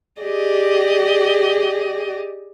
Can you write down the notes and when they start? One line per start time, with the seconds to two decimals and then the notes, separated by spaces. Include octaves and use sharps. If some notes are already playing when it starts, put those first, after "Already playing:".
0.22 G4 G#4 D5 D#5